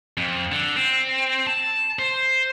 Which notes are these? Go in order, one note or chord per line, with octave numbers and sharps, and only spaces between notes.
F2
D3
C4
A5
C5